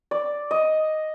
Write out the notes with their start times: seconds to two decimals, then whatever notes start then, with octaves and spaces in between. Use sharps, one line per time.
0.11 D5
0.51 D#5